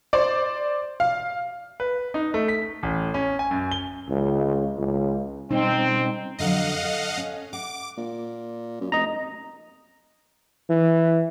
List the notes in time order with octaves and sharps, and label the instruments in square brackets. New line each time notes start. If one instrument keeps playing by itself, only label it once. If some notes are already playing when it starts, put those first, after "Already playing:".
[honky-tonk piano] C5 D5
F5
[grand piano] B4
D#4
A3
B6
A1
C#4
G#5
F#2
G7
[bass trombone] C#2
C#2
[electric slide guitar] B2 G3 C#4 [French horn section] C4 [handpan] D#4
[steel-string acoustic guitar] F2 D3 F#3 [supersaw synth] D#5 F5 F#5
[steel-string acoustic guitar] A4
C#4
[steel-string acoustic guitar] F#5 [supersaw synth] D6
[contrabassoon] A#2
F#2
[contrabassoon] F1 [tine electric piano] D#5 A#5
[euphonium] E3